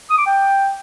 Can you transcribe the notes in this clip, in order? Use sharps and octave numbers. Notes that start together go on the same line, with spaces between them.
D#6
D6
G5